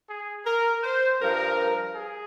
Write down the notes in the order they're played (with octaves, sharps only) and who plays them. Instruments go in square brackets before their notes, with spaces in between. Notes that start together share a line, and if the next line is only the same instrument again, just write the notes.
[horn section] G#4
A#4
C5
G2 F3 A#4
G#4